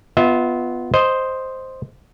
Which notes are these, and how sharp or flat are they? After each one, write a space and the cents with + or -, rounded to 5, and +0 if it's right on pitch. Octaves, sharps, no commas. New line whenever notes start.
B3 +0 F4 +0 E5 -40
C5 +0 D#5 +0